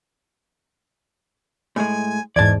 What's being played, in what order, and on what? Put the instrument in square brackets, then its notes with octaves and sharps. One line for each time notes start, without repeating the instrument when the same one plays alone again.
[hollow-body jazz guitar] A2 G#3 [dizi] G#5
[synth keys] E2 G#2 [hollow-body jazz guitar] D5 A5 [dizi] G#6